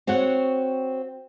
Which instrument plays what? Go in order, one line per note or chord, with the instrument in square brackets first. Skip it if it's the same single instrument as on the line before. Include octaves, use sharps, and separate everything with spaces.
[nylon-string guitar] C4 F#4 C#5 F#5